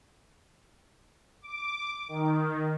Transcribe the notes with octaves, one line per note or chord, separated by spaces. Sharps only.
D6
D#3